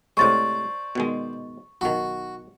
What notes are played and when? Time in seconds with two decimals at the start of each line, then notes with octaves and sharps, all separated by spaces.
0.17 A2 C3 G#3 C5 D5 C#6 A6
0.95 B2 D#3 G#3
1.81 B1 D#3 F#4